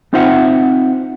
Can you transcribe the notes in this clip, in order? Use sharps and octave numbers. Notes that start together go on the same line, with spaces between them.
C4 D#4 F4 C5 E5 F#5